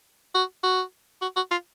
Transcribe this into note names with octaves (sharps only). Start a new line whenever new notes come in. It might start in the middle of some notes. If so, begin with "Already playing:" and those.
F#4
F#4
F#4
F#4
F4